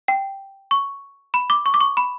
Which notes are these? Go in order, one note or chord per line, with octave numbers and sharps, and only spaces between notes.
G5
C#6
B5
D6
C#6
D6
C#6
B5